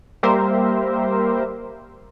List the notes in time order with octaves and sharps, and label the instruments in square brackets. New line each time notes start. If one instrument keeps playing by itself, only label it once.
[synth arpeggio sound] G3 A#3 G4 A#4 C5 E5